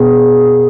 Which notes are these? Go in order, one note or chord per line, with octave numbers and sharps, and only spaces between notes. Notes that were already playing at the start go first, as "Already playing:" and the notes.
Already playing: B2 B3 G#4